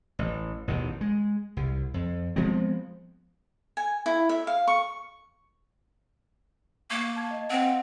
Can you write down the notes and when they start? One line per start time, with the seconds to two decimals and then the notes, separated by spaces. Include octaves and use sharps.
0.19 A1
0.68 A1 D#2 B2 D#3
1.01 G#3
1.57 C2
1.94 F2
2.36 F3 G#3 B3 C4
3.77 G#5
4.06 E4
4.29 E5
4.47 F5
4.68 C#6
6.91 A#3 C#6
7.16 A5 G#6
7.31 D#5
7.50 C4 C5 F5 F#5